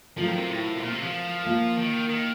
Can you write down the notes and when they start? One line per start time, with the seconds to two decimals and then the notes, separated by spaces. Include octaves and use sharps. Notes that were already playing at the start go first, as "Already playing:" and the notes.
0.17 F3 F#3 A3 C4 F4 A#4
0.28 D#3
0.38 C3
0.49 A2
0.76 C3
0.81 A#2
0.92 C3
1.02 F3
1.45 A#3 F4 A#4
1.77 D#3
2.09 D#3